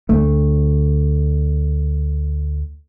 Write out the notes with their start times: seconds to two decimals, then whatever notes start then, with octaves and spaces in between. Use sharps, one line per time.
0.09 D2 D3 A3